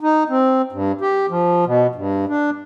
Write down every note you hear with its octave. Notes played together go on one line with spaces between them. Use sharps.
D#4
C4
G2
G4
F3
B2
G2
D4